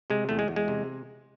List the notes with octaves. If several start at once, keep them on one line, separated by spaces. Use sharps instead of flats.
C3 G#3
E2 A3
G#3
E2
G#3
C3